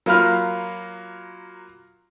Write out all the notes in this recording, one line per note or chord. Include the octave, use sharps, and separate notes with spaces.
F#3 A#3 F4 B5 F6